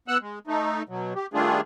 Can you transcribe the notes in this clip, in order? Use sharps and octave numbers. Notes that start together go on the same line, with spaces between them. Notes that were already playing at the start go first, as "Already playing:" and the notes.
B3 F#5 E6 F#6
G#3
A3 D#4
B2 F#3
G4
D#3 G3 A3 D4 F4 G#4